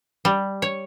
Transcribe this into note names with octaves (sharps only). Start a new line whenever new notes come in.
G3
C#5